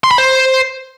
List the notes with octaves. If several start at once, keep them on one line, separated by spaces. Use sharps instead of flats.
C6
B5
C5